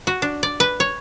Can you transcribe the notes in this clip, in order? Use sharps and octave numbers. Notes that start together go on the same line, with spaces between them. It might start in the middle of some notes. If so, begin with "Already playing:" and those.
F#4
D4
D5
B4
C#5